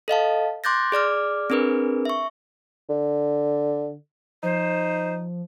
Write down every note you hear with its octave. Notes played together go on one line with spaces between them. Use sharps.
A4 D#5 F5 A5
C6 D6 F#6 G6 A6 A#6
G#4 D5 D6 F6
C4 D4 G#4 A#4 B4
E5 C#6
D3
F3 D#4 C5